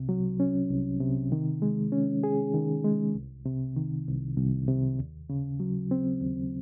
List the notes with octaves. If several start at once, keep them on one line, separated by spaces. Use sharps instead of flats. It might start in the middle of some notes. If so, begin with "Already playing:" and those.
Already playing: C2 C3
F#3
C#4
C2
C3
D#3
G#3
C#4
G#4
D#3
G#3
C2
C3
D#3
C2
C2
C3
D#2
C#3
F#3
C4
D#2